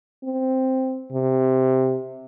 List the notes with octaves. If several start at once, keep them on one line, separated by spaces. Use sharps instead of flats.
C4
C3